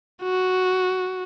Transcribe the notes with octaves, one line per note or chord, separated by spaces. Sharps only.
F#4